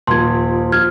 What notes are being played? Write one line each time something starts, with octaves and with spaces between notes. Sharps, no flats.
D#1 F3 C6 G#6
F3 F6 G#6